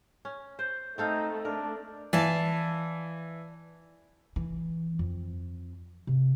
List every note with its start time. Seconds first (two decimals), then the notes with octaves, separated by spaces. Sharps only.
0.25 C#4
0.59 C5
0.98 A3 C4 D#4 A4 F5
1.45 D4 A#4
2.13 E3 D5 F5 A5
4.36 E3
4.99 F2
6.07 C3